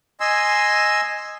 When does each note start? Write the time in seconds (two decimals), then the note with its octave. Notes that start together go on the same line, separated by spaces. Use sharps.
0.20 D#5 G#5 C6 E6